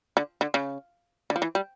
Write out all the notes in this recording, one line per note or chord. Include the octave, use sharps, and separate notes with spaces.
D3
D3
C#3
D3
F3
E3
G3